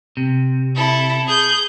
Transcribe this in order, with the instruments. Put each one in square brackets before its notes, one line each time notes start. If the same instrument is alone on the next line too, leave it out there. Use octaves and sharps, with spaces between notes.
[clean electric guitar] C3
[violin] E4 A4
G#4 G6